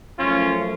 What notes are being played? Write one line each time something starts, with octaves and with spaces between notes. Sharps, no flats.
F#2 F3 A3 C#4 F4